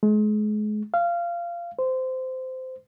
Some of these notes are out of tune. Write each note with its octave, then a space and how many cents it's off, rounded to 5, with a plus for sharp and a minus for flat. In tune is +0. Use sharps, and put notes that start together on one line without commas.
G#3 +35
F5 -20
C5 -15